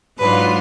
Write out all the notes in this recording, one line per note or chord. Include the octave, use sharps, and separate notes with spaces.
G#2 F#3 D4 F4 B4